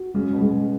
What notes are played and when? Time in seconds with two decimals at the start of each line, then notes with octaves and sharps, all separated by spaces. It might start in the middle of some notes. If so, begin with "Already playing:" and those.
Already playing: F#4
0.14 C#3 G#3
0.33 B2
0.41 C#3 G#3